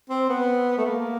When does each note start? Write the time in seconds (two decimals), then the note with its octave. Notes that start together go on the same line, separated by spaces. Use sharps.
0.10 C4
0.29 B3
0.78 A3
0.86 A#3